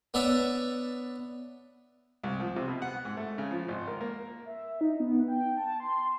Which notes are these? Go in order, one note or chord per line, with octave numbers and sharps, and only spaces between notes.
B3 D4 C#5 D5 E5 A5
C2
F3
C3
B2
F#5
G#2
A3
C#3
F3
G#1
A#4
A#3
E5
D#4
B3
G5
A5
C6